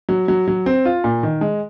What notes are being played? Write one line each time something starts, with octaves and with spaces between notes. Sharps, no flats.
F#3
F#3
F#3
C4
F4
A#2
D#3
G#3